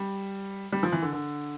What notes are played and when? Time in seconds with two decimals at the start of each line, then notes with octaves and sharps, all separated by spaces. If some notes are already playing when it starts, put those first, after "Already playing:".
Already playing: G3
0.72 G3
0.83 F3
0.92 E3
1.02 D3
1.13 D3